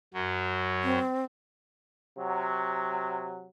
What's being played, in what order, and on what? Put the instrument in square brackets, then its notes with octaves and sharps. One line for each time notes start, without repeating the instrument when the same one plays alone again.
[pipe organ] F#2 F#3
[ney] C4
[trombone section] C3 F#3